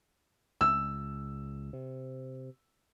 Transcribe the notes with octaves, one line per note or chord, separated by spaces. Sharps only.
C#2 E6
C3